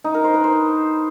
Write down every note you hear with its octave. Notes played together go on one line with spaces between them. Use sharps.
D#4
A#4
C5
B4
C5